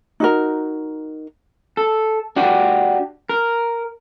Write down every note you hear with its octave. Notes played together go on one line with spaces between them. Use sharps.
D#4 F#4 A#4
A4
D4 F#4 G4
A#4